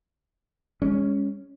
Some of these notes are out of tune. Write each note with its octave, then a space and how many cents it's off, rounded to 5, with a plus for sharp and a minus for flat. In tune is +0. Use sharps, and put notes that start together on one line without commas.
G#3 -30 C#4 +0